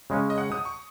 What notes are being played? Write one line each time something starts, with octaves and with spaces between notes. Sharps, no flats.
C#3 G#3 C#4
D#5
F#5
D#6
C#6